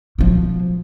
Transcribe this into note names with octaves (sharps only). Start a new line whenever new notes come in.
B2 F3